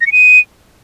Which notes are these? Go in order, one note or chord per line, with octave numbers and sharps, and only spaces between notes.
A#6
C#7
D#7